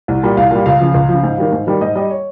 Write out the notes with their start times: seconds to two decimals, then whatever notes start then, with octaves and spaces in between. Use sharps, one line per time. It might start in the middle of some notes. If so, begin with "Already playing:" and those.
0.08 C2
0.23 A#2 G3
0.37 C2 F5
0.51 A#2 G3
0.66 C#2 F5
0.80 C#3 F3
0.94 C#2
1.09 F3
1.14 C#3
1.23 G#2
1.38 D#3 G3
1.52 G#2
1.67 D#3 G3
1.81 G#2 D#5
1.95 G3 D#5
2.10 C#5